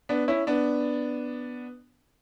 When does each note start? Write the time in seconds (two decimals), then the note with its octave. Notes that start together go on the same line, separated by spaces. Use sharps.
0.09 B3 D4
0.28 C#4 E4
0.47 B3 D4